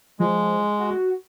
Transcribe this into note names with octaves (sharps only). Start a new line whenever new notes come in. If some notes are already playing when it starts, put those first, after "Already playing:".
F3 G#3
F#4